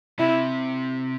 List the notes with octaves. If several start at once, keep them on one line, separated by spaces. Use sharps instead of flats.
C3 E4